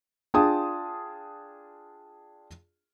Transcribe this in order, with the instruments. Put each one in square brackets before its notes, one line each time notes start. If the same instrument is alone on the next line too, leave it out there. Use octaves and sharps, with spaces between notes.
[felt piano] D4 F4 G#4 G5 A5 D#6